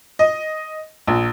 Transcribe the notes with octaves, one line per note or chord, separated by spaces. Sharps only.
D#5
A#1